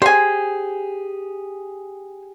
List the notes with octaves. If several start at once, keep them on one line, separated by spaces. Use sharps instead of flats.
G4 G#4 C5 G#5